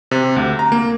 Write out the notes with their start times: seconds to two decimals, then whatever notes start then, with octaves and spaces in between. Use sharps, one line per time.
0.11 C3
0.36 D2
0.59 A#5
0.72 A#3